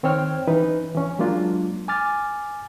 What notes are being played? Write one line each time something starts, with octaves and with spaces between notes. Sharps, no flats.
D#3 C4 C5 C#5 G5 F6
E3 C#4 D#4 B4
E3 C#4
F#3 G#3 A#3 D4 F4
G#5 D6 F6 A6